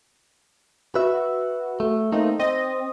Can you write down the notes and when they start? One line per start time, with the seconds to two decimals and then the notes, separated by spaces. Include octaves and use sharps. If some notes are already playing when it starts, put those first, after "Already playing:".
0.95 F#4 B4 E5
1.80 A3
2.12 A3 A#3 C4 D#4
2.40 C4 D#5